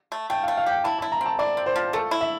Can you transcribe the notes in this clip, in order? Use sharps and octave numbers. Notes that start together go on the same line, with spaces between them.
A3
A3 G5
A3 F5
F5
G4 G5
E4 A5
E4 A5
A#5
C4 A5
E4 D5
C4
C5
F3
A3 A4
E4
E5